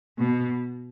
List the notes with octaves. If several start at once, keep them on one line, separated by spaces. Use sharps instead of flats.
B2